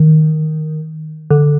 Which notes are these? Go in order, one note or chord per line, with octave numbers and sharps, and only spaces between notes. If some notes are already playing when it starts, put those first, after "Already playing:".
Already playing: D#3
D3